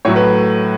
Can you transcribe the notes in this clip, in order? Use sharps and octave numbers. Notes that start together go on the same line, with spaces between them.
A2 F#3 A3 C#5
B4